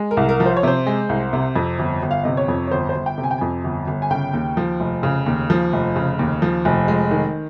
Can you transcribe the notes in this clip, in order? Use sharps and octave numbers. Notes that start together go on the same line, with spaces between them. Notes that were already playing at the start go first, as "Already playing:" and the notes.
Already playing: G#3
A#4
C2
A#4
F3
C5
C#5
C3 C5
G#3
C2
C3
F2
G1
G1
F5
C3 D#5
C#5
F2
C#5
G1 C5
C5
G1
G5
C3
G#5
G5
F2 G#5
G1
G1
G#5
C#3 G5
D#2
F3
F1
C#3
D#2
F3
F1
C#3
D#2
F3
F1
G#3
D#3